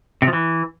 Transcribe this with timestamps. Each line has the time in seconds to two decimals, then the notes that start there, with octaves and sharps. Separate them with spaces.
0.22 C3
0.27 F3
0.33 E3